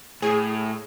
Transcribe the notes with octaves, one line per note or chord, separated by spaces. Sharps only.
A2 G#4